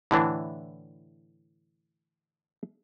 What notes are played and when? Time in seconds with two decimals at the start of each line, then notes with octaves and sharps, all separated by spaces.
0.11 A2 D3 E3 D4